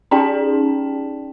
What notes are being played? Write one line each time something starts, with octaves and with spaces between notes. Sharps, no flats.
C#4 D#4 G#4 D5 G5 A5